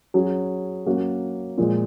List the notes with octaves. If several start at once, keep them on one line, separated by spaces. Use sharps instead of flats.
F#3 C#4 G#4
F#3 A#3 C#4 F#4
A#2 F3 G#3